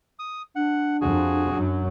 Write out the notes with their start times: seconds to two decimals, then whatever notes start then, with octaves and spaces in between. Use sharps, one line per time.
0.19 D#6
0.56 D4 F#5
1.01 F2 F#4 G#4
1.52 F#2 F#3